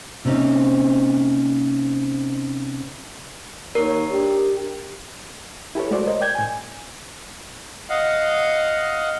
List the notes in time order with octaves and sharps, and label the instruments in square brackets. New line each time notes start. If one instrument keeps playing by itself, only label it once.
[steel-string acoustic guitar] C3 A#3 C4 C#4 D#4
[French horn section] D#2 C#5 [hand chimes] A#4
[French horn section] D4 G4
[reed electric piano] E4 G4 A4 B4 C#5
G#3 A3 F#4 C5 D5
A#4 C5 C#5 D#5
D5 G5 G6 G#6
A2 G#5
[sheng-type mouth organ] D#5 F5 F#5